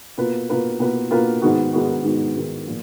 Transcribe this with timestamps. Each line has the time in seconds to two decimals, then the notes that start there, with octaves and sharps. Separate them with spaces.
0.18 B2 A#3 F4 B4
0.50 B2 A#3 F4 B4
0.80 B2 A#3 F4 B4
1.11 B2 A#3 F4 B4
1.42 G#2 D#3 G#3 B3 F#4
1.73 G#2 D#3 G#3 B3 F#4
2.05 G#2 D#3 G#3 B3 F#4
2.35 G#2 D#3 G#3 B3 F#4
2.67 A#2 F3